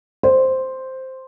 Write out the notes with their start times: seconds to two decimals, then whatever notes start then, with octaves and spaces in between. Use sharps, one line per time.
0.23 C5